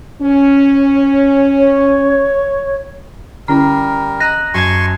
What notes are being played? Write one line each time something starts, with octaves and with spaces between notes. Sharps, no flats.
C#4
C#5
D3 G3 C#4 E4 A#4 A#5
D#5 A#5 F#6 A#6
F#2 G#5 A5 C6 C#6 G#6